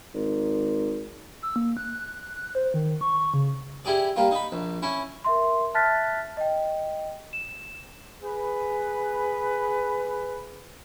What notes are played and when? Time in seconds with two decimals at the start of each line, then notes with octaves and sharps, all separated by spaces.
0.15 G#1
1.43 E6
1.56 A#3
1.77 F#6
2.55 C5
2.74 D#3
3.01 C#6
3.34 C#3
3.85 E4 G4 G#4 D5
4.16 G3 A#3 F4
4.31 D#4 B5
4.52 A#1
4.83 C#4 E4
5.24 A#4 E5 C6
5.74 E5 A5 F6 F#6 A6 B6
6.37 D#5 G5
7.33 E7
8.23 G#4 B4